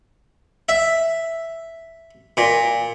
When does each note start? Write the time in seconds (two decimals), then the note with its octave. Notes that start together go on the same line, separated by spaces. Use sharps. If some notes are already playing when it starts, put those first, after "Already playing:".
0.69 E5
2.37 A#2